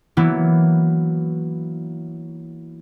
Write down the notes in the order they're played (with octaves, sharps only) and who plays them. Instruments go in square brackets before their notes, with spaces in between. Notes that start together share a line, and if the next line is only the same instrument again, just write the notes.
[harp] E3 F#3 A#3 B3 E4